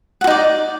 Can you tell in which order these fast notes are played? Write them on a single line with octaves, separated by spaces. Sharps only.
F#5 F#4 D#4 D5